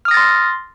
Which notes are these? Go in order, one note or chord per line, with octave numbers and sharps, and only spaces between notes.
C6 D#6 F6 A6 A#6